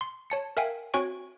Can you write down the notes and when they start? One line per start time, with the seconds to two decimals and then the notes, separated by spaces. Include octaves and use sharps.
0.01 C6
0.30 C#5 A5 C#7
0.57 A#4 E5 F5 G5 G#5
0.94 C4 F#4 C#5 G#5 C#6 D7